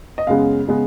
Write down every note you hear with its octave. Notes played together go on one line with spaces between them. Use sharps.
D#5
F#2 C#3 G#3 B3 F5
C#3 G#3 B3